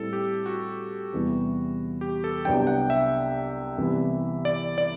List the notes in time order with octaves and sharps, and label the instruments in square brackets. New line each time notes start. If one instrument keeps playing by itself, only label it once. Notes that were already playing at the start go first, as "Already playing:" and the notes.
Already playing: [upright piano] A2 G3 C4 E4 [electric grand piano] A4
[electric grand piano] G4
F#4
[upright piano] E2 C3 E3 G3 B3
[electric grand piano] G4
A4
[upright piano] C2 C3 F#3 B3 D4 [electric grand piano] G5
[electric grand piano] F#5
E5
[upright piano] C2 C3 E3 B3 E4
[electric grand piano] D5
D5